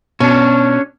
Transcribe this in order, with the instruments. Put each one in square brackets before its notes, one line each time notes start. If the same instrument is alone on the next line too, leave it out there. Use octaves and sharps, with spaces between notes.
[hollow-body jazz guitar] B2 [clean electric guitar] C#4 D4